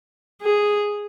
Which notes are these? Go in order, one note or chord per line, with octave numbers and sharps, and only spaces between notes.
G#4